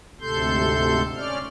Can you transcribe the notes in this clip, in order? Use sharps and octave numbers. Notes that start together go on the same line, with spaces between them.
D2 G#2 C3 A4 C6 G6
C#4 D5 F6